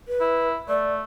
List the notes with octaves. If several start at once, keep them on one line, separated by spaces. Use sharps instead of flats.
B4
E4
A3 D5